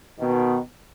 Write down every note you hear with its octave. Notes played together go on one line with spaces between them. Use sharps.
B2 D#3